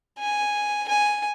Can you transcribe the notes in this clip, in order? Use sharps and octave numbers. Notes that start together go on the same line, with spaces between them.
G#5
G#5